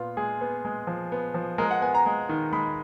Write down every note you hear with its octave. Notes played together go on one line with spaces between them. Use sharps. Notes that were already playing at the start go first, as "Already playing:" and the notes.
Already playing: A#2 B3 F4
G#3 G#4
B3
G#3
F3
B3
F3
G#3 A#4
F#5
B3 G#5
A#5
G#3
D#3
G#3 B5